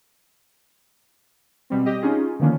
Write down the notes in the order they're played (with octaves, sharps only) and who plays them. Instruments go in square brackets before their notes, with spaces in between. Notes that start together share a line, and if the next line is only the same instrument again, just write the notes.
[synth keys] B2 G3 C4
G4 D#5
C#4 D#4 F4 G#4
D3 D#3 F3 A#3 C#4 D4